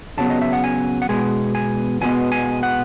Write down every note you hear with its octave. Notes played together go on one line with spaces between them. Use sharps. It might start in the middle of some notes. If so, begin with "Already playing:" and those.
F#2 C#3 F#3 B3 A5
D#5
E5
F#5
G#5
F#5
B2 G#3 B3 G#5
G#5
E2 B2 G#3 B3 G#5
G#5
F#5